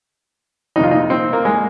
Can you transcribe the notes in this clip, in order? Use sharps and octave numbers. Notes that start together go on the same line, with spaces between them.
F2 C3 D#3 D#4
F4
D#4
C4
A#3
G#3